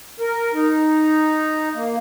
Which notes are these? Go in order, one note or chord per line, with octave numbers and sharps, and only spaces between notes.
A#4
D#4
A#3